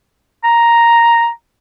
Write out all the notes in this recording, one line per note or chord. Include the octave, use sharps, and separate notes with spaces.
A#5